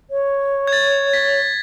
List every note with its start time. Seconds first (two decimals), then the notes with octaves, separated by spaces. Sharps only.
0.11 C#5
0.67 G#6
0.73 A6
1.13 B6